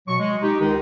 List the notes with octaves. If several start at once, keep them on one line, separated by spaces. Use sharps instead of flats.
B2 F#3 C#6
G#3
D#4 G4
C#2 D#3 G#3 D#4